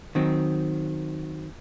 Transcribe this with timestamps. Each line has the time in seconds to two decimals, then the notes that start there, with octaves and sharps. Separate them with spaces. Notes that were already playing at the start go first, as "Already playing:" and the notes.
0.15 D#3 F#3 C4